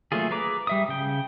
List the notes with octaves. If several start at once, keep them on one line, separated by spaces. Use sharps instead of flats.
F#3 A3 A#3 F4 G#4
G#4 B4 A#5 D6
G3 E5 D#6
C#3 G5